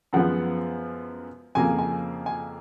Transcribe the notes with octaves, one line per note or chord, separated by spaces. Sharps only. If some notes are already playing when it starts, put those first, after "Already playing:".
F#2 F3 G#3 B3 F#5
F2 C#3 F3 A#3 G#5
G#5
G#5